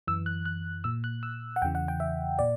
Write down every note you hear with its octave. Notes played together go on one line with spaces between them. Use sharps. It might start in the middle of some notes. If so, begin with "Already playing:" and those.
F#2 E3 E6
F#6
F#6
A#2 E6
F#6
E6
F#5
E2 C#3 E3 G5
F#5
G5
E5
A#2 D5